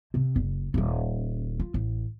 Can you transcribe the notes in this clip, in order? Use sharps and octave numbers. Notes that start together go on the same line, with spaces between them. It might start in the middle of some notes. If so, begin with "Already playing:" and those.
C3 C4
F#1
D#1 C#4
F4
A1